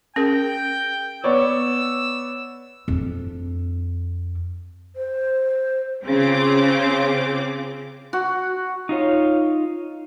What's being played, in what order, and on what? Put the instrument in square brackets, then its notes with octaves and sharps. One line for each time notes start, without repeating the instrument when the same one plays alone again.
[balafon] C#4 G#4 A#4 [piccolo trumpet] G5
[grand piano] B3 C#5 D5 [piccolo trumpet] E6
[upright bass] F2 D4
[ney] C5
[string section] C#3 C4 F4 D6
[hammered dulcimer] F#4
[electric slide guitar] D#4 F4 C#5